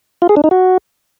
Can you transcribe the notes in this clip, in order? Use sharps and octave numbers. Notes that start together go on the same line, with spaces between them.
F4
G#4
D4
D#4
F#4